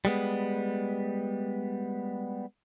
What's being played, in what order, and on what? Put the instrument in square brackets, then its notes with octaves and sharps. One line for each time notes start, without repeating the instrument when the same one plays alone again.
[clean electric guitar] G3 G#3 B3